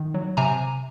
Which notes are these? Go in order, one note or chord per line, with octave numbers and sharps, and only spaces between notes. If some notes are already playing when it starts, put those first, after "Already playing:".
Already playing: D#3
F#3
C3 G#5 A#5